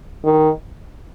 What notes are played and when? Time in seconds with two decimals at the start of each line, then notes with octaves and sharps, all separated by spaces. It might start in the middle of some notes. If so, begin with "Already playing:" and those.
0.24 D#3